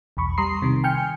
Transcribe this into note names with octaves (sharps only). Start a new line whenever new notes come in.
B1 E2 B5 C#6
G3 A#5 C6 D#6 C7
C3 D#3
G5 G#5 F6 G6 C#7